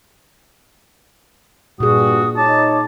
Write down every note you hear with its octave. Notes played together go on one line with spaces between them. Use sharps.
G2 A#2 F#4 G#4 D#6
D#4 C#5 A5 D6